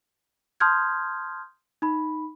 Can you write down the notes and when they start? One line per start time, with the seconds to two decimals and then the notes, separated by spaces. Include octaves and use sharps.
0.60 A5 C6 D#6 F6 G6 G#6
1.82 D#4 B5